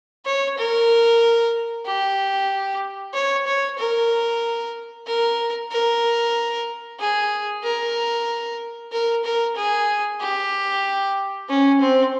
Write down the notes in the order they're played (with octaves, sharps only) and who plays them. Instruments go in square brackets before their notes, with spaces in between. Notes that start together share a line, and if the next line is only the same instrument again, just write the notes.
[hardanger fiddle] C#5
A#4
G4
C#5
C#5
A#4
A#4
A#4
G#4
A#4
A#4
A#4
G#4
G4
C#4
C4